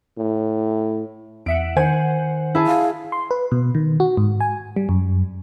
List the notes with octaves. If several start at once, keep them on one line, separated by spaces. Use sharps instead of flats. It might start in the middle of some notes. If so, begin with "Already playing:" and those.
A2
E2 E5 F#5 D7
D#3 C5 F#5 G#5
E4 G#4 A5
F5
C6
B4
B2
D#3
F#4
G#2
G#5
G3
F#2